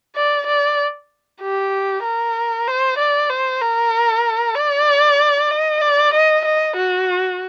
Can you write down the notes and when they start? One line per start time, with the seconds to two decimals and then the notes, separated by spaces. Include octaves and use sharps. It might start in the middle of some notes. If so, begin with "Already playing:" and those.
0.16 D5
0.47 D5
1.41 G4
2.04 A#4
2.68 C5
2.98 D5
3.30 C5
3.62 A#4
4.55 D5
5.51 D#5
5.81 D5
6.14 D#5
6.45 D#5
6.76 F#4